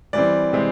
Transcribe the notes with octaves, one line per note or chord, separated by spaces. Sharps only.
E3 G3 C4 D5
C3 E3 G#3 C4